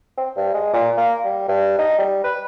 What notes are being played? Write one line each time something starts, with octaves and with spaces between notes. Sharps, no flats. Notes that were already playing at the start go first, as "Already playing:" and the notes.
C4
G2
G#3
A#2
A#3
G3
G2
D#4
G3
B4